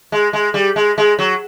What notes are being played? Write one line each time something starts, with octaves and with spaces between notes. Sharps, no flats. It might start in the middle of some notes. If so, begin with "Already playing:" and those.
G#3
G#3
G3
G#3
G#3
F#3